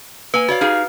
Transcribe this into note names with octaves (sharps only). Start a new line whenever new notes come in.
A#3 B4 G#5
F#4 C#5 D5 F5
D#4 G4 G#4 F5